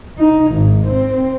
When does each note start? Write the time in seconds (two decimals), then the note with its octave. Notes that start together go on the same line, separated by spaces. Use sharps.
0.18 D#4
0.52 G#1
0.85 C4